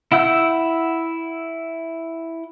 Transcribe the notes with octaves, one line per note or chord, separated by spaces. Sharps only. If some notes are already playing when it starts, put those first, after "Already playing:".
E4 F#5 E6 G6